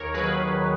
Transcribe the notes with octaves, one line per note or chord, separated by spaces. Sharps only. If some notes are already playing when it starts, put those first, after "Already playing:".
Already playing: D#2 A#4 C#5
D#3 F#3 G#4 B4
D#2